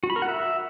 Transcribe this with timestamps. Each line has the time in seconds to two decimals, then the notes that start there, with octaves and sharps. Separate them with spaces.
0.03 F#4
0.10 B5
0.16 A#4
0.22 F#5
0.28 E5